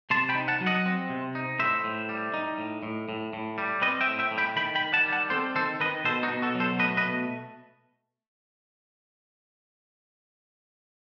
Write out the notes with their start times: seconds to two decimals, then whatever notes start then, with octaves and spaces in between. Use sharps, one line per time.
0.10 C3 A5 C6
0.29 G5 B5
0.35 D#4
0.48 F#5 A5
0.61 F#3
0.66 D#5 F#5
0.86 C4
1.10 C3
1.35 D#4
1.59 A2 C5 E5
1.84 A2
2.09 G3
2.34 D#4
2.58 A2
2.83 A2
3.09 A2
3.33 A2
3.58 G3
3.82 C4 B4 D#5
4.01 E5 G5
4.07 A2
4.19 E5 G5
4.31 A2
4.38 G5 B5
4.56 D#3 G5 B5
4.75 G5 B5
4.82 D#3
4.93 F#5 A5
5.06 G3
5.12 F#5 A5
5.30 C4 A4 C5
5.55 D#3 A4 C5
5.80 D#3 B4 D#5
6.05 B2 A4 C5
6.23 D#4 F#4
6.29 B2
6.42 F#4 A4
6.55 F#3
6.60 A4 C5
6.79 A3 B4 D#5
6.97 B4 D#5
7.04 B2